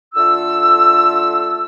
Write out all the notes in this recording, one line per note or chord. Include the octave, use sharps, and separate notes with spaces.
D3 A3 F4 E6